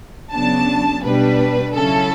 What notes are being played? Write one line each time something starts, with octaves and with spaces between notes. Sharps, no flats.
C#3 F#3 B3 D4 A5
B2 G3 D4 B4
C#3 F#3 C#4 E4 A4